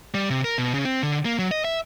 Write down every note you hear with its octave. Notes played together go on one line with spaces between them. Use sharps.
G3
C3
A#4
B2
C#3
C4
D3
A#3
F#3
D#5
E5